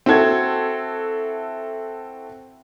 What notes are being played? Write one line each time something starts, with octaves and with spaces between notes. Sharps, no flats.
C4 E4 F#4 A4 G#6